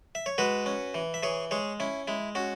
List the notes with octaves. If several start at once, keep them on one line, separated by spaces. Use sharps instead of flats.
E5
C#5
G#3 F#4 B4
C#4
E3
E5
E3 G#4 C#5
G#3 G#4 C#5
C#4 E4
G#3 E4
C#4 F#4